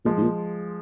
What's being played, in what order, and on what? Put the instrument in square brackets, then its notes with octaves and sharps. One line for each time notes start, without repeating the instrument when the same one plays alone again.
[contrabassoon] A#2 [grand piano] F3 G#3
[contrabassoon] G#2
A#2